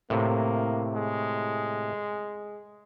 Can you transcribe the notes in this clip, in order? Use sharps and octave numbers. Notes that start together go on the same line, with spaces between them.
A2 C3 A#3
G#3